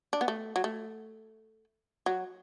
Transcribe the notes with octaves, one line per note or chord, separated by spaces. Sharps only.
D4
B3
A3
F#3
A3
F#3